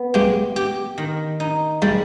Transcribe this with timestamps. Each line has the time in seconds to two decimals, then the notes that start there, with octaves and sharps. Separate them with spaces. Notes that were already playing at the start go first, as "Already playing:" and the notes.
Already playing: B3
0.14 G#3 G4
0.56 G4
0.98 D#3
1.40 D#4
1.82 G3 G#3